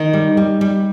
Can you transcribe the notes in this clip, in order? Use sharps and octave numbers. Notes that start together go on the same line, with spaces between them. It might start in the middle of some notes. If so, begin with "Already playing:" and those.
Already playing: D#3 D#4
G3
G3
G3